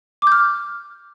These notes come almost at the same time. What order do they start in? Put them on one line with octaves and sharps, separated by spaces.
D6 G6 F6